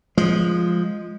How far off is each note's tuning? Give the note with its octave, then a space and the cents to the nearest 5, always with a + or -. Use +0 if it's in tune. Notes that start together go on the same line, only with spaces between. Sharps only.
F3 +0 G#3 +0